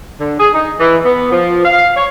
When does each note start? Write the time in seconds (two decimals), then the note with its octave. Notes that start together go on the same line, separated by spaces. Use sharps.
0.20 D3
0.39 G#4
0.54 D#4
0.79 E3
1.05 B3
1.31 F3
1.64 F5
1.96 C#5